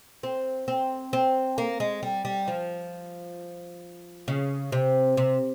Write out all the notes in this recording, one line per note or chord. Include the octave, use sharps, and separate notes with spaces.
C4
C4
C4
A#3
G#3
G3
G3
F3
C#3
C3
C3